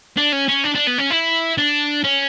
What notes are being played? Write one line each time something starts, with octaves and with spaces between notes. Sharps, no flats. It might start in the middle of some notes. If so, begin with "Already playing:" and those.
D4
C#4
C#4
D4
D4
B3
C#4
E4
D4
C#4